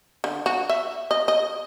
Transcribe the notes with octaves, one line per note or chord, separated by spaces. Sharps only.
D3
F#4
E5
D#5
D#5